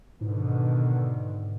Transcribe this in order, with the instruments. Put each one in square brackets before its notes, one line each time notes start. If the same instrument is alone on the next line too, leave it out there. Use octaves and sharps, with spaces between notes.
[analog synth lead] G#2 [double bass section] B2 D3 D#3